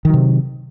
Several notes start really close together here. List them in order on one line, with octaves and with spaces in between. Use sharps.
D#3 F#3 C3